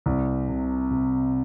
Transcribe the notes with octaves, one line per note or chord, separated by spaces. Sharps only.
C2
C3
C3